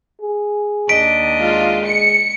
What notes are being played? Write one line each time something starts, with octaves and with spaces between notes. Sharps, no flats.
G#4
D#2 D4 D#5 B6 D7
G#3 F4
C#7